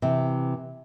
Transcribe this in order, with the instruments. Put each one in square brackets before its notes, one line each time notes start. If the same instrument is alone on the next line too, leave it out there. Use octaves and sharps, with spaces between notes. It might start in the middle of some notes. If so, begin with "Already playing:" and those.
[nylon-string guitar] C3 E3